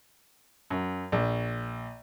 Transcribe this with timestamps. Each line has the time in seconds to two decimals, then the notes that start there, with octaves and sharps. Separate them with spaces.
0.70 F#2
1.12 A#1